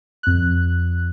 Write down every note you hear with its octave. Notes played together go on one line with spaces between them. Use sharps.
F2 F#6